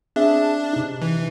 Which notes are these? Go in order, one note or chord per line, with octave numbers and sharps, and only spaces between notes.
C4 D4 G#4 E5
C3 D#4
E3